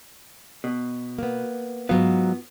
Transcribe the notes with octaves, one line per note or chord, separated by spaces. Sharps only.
B2
A#3 B3
G#2 F#3 B3 F4 F#4 F5